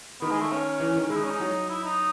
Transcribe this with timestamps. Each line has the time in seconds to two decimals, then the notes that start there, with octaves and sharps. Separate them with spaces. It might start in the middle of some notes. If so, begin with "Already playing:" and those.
0.21 D#3 B3
0.31 G#3
0.41 A3
0.52 C#4
0.80 E3
0.96 D#3
1.10 G#3 E4
1.17 D#4
1.24 C#4
1.31 D#4
1.40 F#3
1.69 E4
1.84 D#4